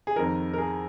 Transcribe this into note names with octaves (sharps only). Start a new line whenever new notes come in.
G#4
F2 D#3 A#4
A#4
G#4